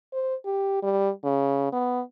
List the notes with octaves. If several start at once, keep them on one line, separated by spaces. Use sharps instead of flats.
C5
G4
G3
C#3
B3